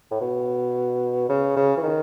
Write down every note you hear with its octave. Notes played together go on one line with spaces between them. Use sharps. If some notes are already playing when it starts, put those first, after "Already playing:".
A2
B2
C#3
C#3
E3
D#3